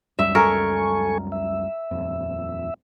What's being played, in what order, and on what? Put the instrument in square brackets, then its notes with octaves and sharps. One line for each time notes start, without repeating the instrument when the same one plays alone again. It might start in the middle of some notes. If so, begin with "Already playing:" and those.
[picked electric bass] C#2 F#2 G3 [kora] E5
[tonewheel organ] A4 G#5 C#6 [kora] A#4
[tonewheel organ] E5
[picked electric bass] D#1 F2